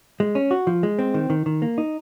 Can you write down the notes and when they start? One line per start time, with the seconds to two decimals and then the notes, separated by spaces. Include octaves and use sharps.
0.20 G#3
0.35 C#4
0.51 F#4
0.67 F3
0.83 G#3
0.99 C4
1.14 D#3
1.30 D#3
1.46 D#3
1.62 A#3
1.78 D#4